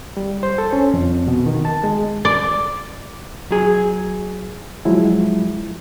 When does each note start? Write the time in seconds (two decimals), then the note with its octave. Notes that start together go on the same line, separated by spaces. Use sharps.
0.17 G3
0.43 C5
0.58 A4
0.73 C#4
0.94 F2
1.27 B2
1.46 D#3
1.65 A5
1.84 G#3
2.25 D5
3.51 F#3 G#4
4.85 F3 F#3 G#3 E4